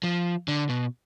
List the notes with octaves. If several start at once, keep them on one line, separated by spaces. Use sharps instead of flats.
F3
D3
B2